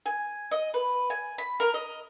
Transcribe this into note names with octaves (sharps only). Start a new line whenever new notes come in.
G#5
D#5
B4
G#5
B5
A#4
D#5